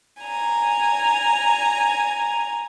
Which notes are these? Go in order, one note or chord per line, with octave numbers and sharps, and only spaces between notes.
G#5 A#5